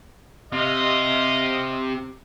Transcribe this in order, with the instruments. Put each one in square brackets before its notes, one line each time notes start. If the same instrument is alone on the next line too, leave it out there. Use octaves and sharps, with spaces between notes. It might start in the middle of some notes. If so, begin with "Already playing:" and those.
[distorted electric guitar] C3 [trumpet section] D#5 F5